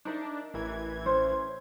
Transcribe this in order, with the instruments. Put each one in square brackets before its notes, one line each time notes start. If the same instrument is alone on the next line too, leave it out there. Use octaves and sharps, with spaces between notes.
[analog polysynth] D4 [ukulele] D#4 A#4 E5
[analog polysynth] A1 E3 G#6 [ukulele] A#4
[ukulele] C#4 C5